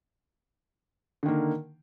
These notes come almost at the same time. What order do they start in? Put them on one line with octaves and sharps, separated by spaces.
D3 D#3 A#3